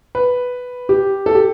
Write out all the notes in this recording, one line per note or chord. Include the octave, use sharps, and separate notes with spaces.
B4
G4
A4
G4